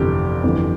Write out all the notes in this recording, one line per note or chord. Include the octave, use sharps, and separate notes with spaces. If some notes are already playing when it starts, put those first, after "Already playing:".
Already playing: G1 F2 C3 E3 G4
G1 F2 E3